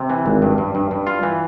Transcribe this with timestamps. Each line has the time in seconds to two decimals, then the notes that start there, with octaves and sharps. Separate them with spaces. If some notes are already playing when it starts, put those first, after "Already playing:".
Already playing: C3
0.10 E3
0.26 G#1
0.42 G2
0.58 G2
0.75 G2
0.91 G2
1.06 F4
1.23 E3